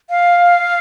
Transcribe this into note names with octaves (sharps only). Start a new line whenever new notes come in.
F5